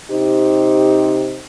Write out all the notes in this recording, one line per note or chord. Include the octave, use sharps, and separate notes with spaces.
C3 D#4 G4 C5